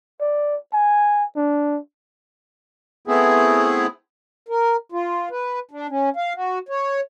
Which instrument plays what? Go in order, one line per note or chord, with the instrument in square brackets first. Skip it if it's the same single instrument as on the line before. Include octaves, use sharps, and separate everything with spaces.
[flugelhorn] D5
G#5
D4
[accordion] A3 B3 C4 E4 G#4
[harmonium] A#4
F4
B4
D4
C#4
F5
F#4
C#5